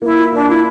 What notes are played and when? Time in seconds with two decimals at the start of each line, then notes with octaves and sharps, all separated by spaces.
0.02 A#3 E4
0.17 F4
0.33 A#3 D4
0.48 E4 F4